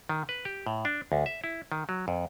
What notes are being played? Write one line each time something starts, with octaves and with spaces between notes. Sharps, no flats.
D#3
B4
G4
A2
D4
D2
E5
E4
D#3
F#3
F2